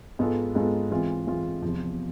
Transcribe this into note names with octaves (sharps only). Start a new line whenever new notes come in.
G#2 G#3 B3 F4 A4
G#2 G#3 B3 F4 A4
E3 G#3 C4 F4
E3 G#3 C4 F4
E2 C3 F3